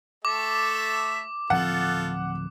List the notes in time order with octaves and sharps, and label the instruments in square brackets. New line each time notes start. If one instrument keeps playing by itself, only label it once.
[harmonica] A3 A4 E5 [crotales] D6
[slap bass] D1 F3 C4 [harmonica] F4 A4 [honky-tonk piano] F#5 F#6